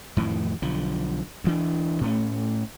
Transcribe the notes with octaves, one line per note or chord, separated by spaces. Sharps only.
F2 A2 D#3 E3
B1 D3 F3
D2 E3 D4
A2 A3 C#4